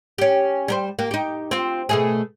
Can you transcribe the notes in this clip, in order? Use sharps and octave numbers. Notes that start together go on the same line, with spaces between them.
C#4 G4
G3 A#4 C5
A#3 G4
D#4 G4
C4 F4
B2 A3 G#4